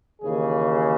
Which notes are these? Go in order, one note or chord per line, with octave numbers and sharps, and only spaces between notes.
D#2 C#3 E3 G#4